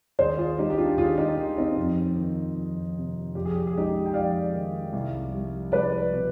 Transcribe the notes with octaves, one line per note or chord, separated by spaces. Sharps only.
D#2 G#4 C5
F4 G#4
G3 D#4 G4
G4
D4 F4
D#2 F4 G#4
D#4 G4
D#3
C4 D#4
F2
D#3
F2
C3
F2 G4
G#4
G4
G#4
G#3 D#4 G4
G5
F2 D5 F5
D#3
C2
G3
C2 B4 D5
B2